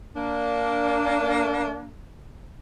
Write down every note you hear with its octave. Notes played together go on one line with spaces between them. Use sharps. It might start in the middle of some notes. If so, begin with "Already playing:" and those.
A#3 D4